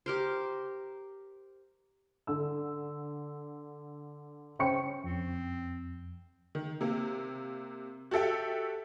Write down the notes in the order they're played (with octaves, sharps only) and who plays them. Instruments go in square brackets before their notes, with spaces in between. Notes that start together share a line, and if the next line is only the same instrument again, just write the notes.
[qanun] G4 A#4 C5
[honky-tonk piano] D3 E6
C#3 C#4 C5 G5 C#6 C#7
[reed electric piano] F2 [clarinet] C4
[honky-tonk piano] D#3
C3 A#3
F#4 G4 A4 E5 G5